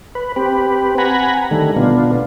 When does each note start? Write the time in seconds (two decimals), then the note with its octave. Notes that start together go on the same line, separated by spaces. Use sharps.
0.15 B4
0.36 C4 G4 B4
0.98 F#5 G#5 A#5 B5
1.51 D3 D#3 G3 A3
1.76 B2 B3 D4 F4